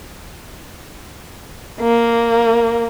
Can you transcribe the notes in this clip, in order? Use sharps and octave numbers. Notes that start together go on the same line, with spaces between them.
A#3